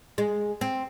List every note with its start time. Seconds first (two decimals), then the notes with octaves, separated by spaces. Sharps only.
0.18 G#3
0.61 C4